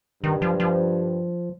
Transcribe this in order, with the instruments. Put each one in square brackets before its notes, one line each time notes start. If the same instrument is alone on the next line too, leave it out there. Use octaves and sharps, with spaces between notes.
[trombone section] G2 [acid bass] D#3
[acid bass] F3
F3